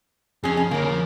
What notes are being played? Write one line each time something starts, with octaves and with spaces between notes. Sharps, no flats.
F2 C#4 G#4
C#4
D3 A#3 A#4 C#5
F3